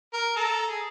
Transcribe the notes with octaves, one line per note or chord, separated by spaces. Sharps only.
A#4
A4 A#5
G#4